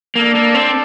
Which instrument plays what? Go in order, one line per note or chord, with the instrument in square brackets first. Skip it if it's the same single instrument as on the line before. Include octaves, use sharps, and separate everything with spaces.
[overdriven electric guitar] A#3 [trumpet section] D4 A4 D5
[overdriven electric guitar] A#3
C4